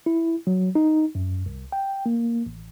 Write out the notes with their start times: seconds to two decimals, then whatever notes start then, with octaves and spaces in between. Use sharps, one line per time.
0.06 E4
0.47 F#3
0.75 D#4
1.15 F#2
1.46 C2
1.72 G5
2.06 A#3
2.46 A1